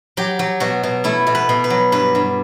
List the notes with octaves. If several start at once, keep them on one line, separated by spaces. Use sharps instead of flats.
F#3 G4
F#3
B2 F#4
B2
A3 E4
B2
B4
B2
B4
F#3
G2 B4
G2